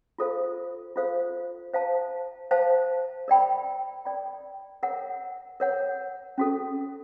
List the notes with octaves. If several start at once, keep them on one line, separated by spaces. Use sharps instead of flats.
F4 A4 C5 F5
F4 A4 C5 F5
C5 F5 A5
C5 F5 A5
A#4 D5 G5 B5
A#4 D5 G5 B5
A#4 C#5 F#5
A#4 C#5 F#5
C#4 F#4 A4